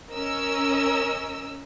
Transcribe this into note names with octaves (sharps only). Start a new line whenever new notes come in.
C#4 A#4 D#5 E6